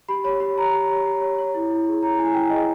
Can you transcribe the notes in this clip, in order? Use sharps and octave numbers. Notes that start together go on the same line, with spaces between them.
G4 B5
C#5 B5
G4 B5
C#5 A#5
G4
C#5
G4
C#5
C#5
E4
E4
G#4
C#5 A#5
E4 G#5
E4 G5
G#4 D#5